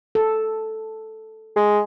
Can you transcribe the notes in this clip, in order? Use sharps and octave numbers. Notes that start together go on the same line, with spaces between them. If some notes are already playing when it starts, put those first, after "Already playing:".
A4
G#3